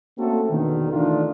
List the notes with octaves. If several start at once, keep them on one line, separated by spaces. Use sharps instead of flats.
A3 A#3 C4 C#4 F#4 A4
E2 B2 D3 D#3
D#3 E3 A3 D4 D#4 F4